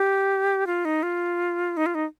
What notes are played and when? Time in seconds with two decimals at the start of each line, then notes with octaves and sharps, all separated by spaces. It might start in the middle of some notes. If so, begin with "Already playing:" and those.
Already playing: G4
0.67 F4
0.85 D#4
1.03 F4
1.77 D#4
1.86 F4
1.95 D#4